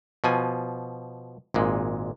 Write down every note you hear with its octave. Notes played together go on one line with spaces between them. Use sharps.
B2 F3 G#5
G#1 A#2 G#3